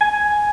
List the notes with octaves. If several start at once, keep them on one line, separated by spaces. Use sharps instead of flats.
G#5